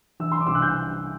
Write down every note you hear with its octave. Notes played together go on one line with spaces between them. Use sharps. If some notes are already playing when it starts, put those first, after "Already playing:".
E3 E6
C6
D6
C2 E6
F#6
G6